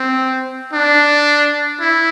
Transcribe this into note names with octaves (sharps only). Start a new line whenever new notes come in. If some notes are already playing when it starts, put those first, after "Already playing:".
Already playing: C4
D4
E4